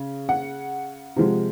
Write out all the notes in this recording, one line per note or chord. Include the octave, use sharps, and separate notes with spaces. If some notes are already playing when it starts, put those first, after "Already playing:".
Already playing: C#3
F#5
C3 F3 G#3